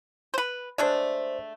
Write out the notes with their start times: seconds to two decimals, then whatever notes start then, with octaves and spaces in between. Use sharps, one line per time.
0.34 B4 C5
0.78 G#3 A3 D4 C5 D5